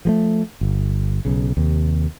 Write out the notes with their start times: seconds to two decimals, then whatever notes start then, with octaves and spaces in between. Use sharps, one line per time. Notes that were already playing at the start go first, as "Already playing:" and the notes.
0.05 F3 G#3 A3
0.61 G1
1.25 B1 C#3
1.57 D#2 C3